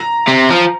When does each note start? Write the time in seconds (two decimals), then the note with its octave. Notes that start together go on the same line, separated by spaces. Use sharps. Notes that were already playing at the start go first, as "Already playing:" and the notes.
Already playing: A#5
0.28 C3
0.51 F3